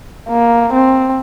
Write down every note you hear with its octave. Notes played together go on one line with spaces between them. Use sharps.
A#3
C4